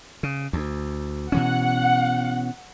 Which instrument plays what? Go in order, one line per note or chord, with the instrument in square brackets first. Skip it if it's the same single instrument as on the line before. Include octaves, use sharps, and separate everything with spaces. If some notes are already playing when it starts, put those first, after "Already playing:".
[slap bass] C#3
D2
[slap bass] B2 E3 C#4 [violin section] F#5